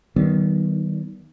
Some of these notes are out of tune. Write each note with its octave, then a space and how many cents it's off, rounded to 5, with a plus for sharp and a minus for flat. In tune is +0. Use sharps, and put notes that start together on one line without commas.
D#3 +0 G3 -45 B3 -10